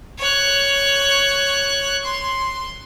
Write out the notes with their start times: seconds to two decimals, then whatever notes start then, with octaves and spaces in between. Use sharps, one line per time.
0.19 C#5 F#6
2.04 C6